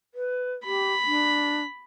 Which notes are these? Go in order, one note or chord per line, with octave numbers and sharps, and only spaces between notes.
B4
G4 B5
D4